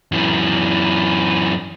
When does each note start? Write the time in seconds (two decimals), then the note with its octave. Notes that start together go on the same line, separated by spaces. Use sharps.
0.12 F#2 E3